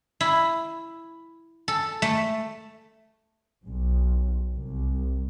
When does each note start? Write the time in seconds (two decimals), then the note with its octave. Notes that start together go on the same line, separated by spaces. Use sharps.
0.21 E4
1.68 A4
2.02 A3
3.65 B1
4.55 C2